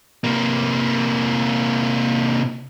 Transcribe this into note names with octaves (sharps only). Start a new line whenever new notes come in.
C3 A#3